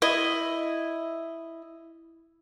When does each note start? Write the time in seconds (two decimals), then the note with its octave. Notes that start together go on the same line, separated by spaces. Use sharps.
0.02 E4 D#5